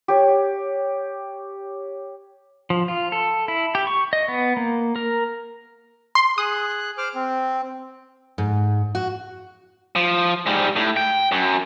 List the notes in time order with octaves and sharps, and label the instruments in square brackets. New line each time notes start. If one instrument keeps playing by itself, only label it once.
[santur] G4 C#5
[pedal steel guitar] F3
F4
A4
E4
G4
C#6
D#5
B3
A#3
A#4
[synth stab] C6
[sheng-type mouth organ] G#4 F#6 [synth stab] D#6
[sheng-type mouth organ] C5 D6 F6
C4
[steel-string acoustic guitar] G#2
F#4
[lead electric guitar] F3
G#2 G3
A2
G5
F#2